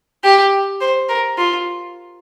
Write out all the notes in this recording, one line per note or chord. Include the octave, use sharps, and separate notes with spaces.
G4
C5
A#4
F4